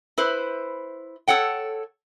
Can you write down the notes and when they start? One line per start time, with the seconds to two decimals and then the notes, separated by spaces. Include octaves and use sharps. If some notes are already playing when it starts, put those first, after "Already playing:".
0.18 E4 B4 C5
1.28 A4 C#5 F#5 G5